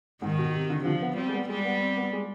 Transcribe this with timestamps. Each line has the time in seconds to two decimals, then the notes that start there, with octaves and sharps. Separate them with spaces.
0.22 G#2 D#3
0.38 B2
0.54 C3
0.70 D3
0.79 C3
0.85 D3 F3
1.02 B3
1.17 G3 C4
1.29 G#3
1.33 B3
1.49 G3 G#3
1.65 B3
1.80 C4
1.97 B3
2.13 G#3